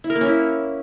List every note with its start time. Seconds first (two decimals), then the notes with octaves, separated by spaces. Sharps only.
0.04 E4
0.10 A#4
0.15 A#3
0.21 C#4
0.27 E4